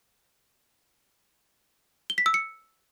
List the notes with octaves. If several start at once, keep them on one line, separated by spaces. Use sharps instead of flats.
G7
B6
E6
C#7